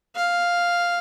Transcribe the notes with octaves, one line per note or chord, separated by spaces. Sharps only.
F5